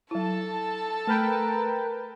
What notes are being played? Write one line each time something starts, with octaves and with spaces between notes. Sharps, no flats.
F#3 E4 A4 A5
A3 A#4 B4 G5